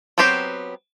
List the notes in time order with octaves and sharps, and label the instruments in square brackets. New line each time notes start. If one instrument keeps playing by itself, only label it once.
[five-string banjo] F#3 B3 C4 G4 C5